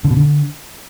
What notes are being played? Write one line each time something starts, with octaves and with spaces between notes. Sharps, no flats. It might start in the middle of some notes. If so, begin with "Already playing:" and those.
D3
B2
D3